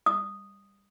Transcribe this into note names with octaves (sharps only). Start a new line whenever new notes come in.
D#6